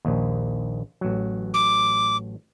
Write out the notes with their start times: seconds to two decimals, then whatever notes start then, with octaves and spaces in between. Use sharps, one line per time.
0.05 A#1 D#2
1.01 A1 F#3
1.54 D6